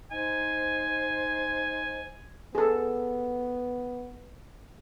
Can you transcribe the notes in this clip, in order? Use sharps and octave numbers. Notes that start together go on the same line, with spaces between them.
D#4 C5 G#5
B3 G#4 A4